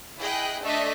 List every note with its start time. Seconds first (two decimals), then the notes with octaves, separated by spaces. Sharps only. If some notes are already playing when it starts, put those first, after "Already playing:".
0.19 E4 G#4 D#5 G5 F#6
0.62 A3 D4 A4 D#5 E5